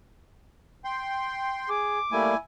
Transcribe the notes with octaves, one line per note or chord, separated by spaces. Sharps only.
G5 C6
G#4 D6
G3 A3 A#3 E4 G#5